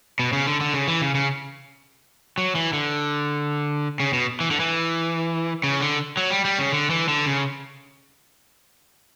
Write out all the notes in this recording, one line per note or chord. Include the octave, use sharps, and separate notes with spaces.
B2
C#3
D3
D3
C#3
E3
C#3
C#3
F#3
E3
D3
C#3
B2
E3
D3
E3
C#3
D3
F#3
G3
G3
C#3
D3
E3
D3
C#3